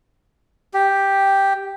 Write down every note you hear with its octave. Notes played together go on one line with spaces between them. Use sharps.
G4